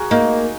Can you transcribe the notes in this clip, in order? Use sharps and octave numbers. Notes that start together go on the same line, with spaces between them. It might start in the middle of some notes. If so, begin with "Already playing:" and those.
Already playing: F#4 G#4 A#4
A#3 D#4